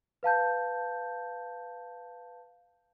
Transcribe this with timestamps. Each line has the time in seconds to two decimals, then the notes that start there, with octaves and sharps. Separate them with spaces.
0.23 B4 F5 A5 G6